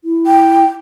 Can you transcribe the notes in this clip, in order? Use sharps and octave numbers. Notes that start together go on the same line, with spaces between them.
E4
G5